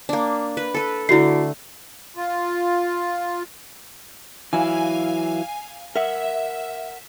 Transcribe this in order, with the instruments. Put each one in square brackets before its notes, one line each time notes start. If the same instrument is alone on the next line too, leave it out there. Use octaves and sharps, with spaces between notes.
[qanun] A#3 D4
B4
A4 B4
[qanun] D3 A3 [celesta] E4 F#4 C7
[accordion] F4
[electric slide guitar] E3 F#3 E4 [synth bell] F5 G#5
[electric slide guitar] A#4 F#5 [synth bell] E5